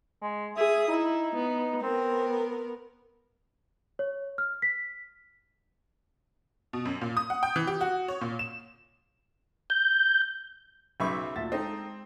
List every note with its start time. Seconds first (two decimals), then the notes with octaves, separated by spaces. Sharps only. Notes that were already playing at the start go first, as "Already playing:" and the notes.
0.21 G#3
0.57 G#4 E5 D#6
0.89 D#4 E4
1.36 B3
1.83 B3 C4 A#4
3.99 C#5
4.38 F6
4.62 B6
6.73 B2
6.85 F#2
7.01 A#2
7.17 D#6
7.30 F#5
7.43 G5
7.56 E3
7.67 G4
7.81 F#4
8.08 C#5
8.21 A#2
8.39 E7
9.70 G6
11.00 B1 C#3 E5 B5 C#6 D6 G6
11.36 D2 A#2 E5 A6
11.52 G#3 C4 D#4 A4 D#5 C7